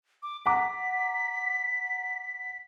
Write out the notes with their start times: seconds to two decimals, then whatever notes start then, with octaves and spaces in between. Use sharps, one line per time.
0.23 D6
0.46 F#5 A#5 D6 B6